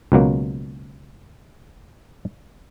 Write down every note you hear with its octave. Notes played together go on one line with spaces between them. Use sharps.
C#2 B2 F#3 A#3